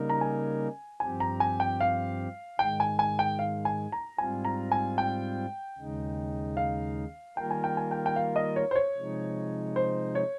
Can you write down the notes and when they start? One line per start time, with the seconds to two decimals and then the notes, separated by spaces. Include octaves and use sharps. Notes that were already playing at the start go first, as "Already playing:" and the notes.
Already playing: C#3 G3 A#3 D#4 A#4
0.10 A#5
0.21 G#5
1.00 G2 F3 C4 G4 G#5
1.20 A#5
1.40 G#5
1.60 G5
1.80 F5
2.59 G#2 D#3 G#3 G5
2.80 G#5
2.99 G#5
3.19 G5
3.39 F5
3.65 G#5
3.92 A#5
4.18 G#2 G3 C4 F4 G#5
4.45 A#5
4.72 G#5
4.98 G5
5.78 D#2 C#3 G#3 D#4
6.57 F5
7.37 D#3 G3 A#3 F4 A#4 G5
7.51 G#5
7.64 G5
7.77 G#5
7.91 G5
8.06 G5
8.16 F5
8.36 D#5
8.56 C#5
8.71 C5
8.75 C#5
8.96 C3 F3 G#3 D#4
9.76 C5
10.15 C#5